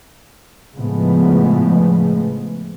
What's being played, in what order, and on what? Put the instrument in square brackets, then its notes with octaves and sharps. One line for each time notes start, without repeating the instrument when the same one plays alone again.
[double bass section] A2 C#3 F3 G#3 A3 B3